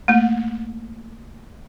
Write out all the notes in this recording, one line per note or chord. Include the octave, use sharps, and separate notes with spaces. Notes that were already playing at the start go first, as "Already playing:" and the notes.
A3 A#3